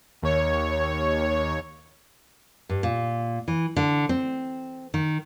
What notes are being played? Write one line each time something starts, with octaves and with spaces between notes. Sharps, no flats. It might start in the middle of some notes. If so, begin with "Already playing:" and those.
D#2 C#5
G2
A#2
E3
D3
C4
D#3